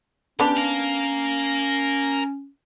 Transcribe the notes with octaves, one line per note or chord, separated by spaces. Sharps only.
B3 C#4 D4 G4
A#4 F5